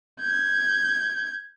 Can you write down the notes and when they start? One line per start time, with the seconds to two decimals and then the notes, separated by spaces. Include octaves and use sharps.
0.21 G6 G#6